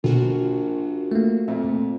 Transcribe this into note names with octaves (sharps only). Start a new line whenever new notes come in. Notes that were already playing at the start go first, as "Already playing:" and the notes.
A#1 B2 D3 F4 F#4 A#4
A3 A#3
F2 A#2 E5